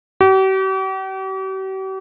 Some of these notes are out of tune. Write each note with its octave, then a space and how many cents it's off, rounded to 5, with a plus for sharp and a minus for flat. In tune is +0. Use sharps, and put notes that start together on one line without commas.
G4 -45